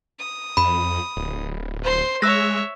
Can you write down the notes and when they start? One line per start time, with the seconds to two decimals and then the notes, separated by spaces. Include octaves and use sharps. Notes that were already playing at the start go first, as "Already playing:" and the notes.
0.19 D#6
0.57 F2 B5
1.17 D1
1.83 C5 C6
2.22 G#3 C#5 E5 E6 F#6 A#6